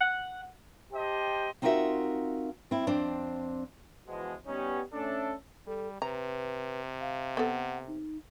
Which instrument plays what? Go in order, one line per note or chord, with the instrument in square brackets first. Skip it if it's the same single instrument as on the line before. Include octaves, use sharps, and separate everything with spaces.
[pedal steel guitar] F#5
[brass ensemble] G4 C5 D#5 G5 A5
[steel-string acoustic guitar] C4 D#4 F4 F#4 A#4 E5
C4 E4
F2 C4 D4 C5
[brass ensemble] B2 E3 F3 G#3
G3 B3 C#4 D#4
A3 C#4 D4 A4
[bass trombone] G3 [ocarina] A4
[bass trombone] C3 [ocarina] B4 [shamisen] A#5
[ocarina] F5
[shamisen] B3 A4 [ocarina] F#5
[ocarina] D#4